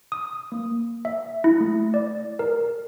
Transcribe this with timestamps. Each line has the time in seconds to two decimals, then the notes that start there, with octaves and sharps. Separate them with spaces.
0.12 D#6
0.52 A#3
1.05 E5
1.44 E4
1.60 A3
1.94 D5
2.39 A#4